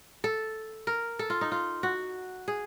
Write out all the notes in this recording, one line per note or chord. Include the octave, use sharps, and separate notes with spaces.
A4
A#4
A4
F4
D#4
F4
F#4
G#4